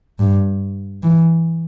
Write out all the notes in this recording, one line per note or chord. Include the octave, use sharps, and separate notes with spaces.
G2
E3